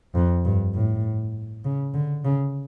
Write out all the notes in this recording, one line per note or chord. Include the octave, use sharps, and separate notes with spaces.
F2
G2
A2
C#3
D3
C#3